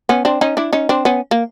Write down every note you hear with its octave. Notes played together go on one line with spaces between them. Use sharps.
B3 C#4
C4 D4
C#4 D#4
D4 E4
C#4 D#4
C4 D4
B3 C#4
A#3